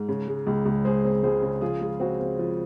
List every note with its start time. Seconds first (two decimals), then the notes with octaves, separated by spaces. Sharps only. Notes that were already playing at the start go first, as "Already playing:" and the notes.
Already playing: G#2
0.09 C#3
0.28 G#3
0.47 C#2
0.65 C#2
0.85 G#3 G#4 C5
1.05 C4
1.23 C#2 G#4 C5
1.43 C#3
1.61 F3 F4 G#4
1.81 G#3
2.00 C4 F#4
2.20 C4
2.39 F3